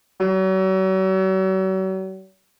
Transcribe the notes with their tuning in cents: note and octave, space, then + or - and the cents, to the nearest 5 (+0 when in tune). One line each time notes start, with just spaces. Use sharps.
F#3 +40